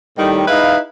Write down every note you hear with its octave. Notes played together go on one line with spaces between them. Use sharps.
A2 D#3 G3
G#3 D#4 E4 B4 F5